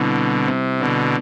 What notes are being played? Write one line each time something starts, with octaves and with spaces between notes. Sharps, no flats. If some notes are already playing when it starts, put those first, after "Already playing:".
Already playing: B2 D3 G3 C4 E4
C3
B2 D3